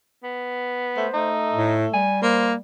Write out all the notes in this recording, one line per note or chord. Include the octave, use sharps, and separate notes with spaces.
B3
A3 C5
A3 D#4
A2
G3 G#5
A#3 C5